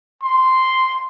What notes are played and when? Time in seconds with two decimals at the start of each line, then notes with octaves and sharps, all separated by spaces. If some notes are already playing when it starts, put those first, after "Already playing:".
0.22 C6